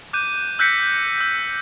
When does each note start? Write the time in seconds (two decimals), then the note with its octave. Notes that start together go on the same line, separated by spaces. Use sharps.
0.13 D6 F#6 G6 D#7
0.59 E6 F#6 G6 A#6 B6 C#7
1.21 E6